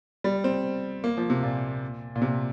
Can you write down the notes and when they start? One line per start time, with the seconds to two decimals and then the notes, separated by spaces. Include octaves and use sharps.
0.24 G3
0.44 C4
1.04 A#3
1.17 F3
1.30 C3
1.43 A#2
2.16 A#2
2.22 C3